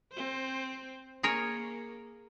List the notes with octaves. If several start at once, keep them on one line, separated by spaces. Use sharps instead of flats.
C4 C5
A#3 G#4 A#4 C#5